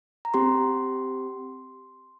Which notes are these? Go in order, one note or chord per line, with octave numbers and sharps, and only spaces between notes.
A#5
C4 G4 C6